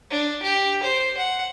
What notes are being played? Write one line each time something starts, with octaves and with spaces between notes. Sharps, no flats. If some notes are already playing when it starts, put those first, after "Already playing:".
D4
G4
C5
F#5